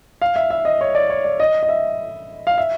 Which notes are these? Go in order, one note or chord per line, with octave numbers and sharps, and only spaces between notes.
F5
E5
E5
D#5
C#5
D5
C#5
D5
D#5
D#5
E5
F5
E5